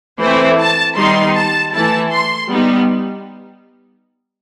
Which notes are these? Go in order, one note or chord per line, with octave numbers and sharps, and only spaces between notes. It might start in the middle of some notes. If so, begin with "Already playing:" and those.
E3 A3 C4 E4 C5
A5
D#3 G3 B3 D#4 C6
A5
E3 A3 E4 A5
C6
G3 B3 D#4